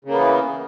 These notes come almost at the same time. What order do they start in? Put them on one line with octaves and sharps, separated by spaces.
C#3 A#3 B3 E3